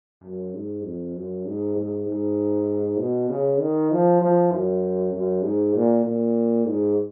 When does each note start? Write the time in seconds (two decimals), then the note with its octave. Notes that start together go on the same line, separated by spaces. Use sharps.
0.24 F#2
0.54 G#2
0.85 F2
1.16 F#2
1.47 G#2
1.77 G#2
2.07 G#2
2.99 B2
3.29 C#3
3.60 D#3
3.91 F3
4.21 F3
4.52 F#2
5.13 F#2
5.43 G#2
5.75 A#2
6.05 A#2
6.66 G#2